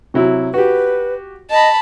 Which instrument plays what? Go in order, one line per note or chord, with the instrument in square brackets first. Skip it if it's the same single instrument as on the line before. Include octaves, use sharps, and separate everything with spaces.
[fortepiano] C3 F#3 E4
[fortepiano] F#4 G4 [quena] B4
[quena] D#5 [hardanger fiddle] A5 B5